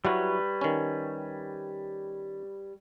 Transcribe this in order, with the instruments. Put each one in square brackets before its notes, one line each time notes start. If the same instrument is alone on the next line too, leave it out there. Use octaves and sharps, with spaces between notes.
[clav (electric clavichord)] F#3 E4 F#4 [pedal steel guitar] G3 B4 C#5
[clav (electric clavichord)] D#3 C#4